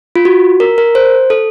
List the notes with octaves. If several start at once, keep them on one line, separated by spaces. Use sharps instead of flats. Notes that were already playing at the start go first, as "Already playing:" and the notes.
F4
F#4
A#4
A#4
C5
A4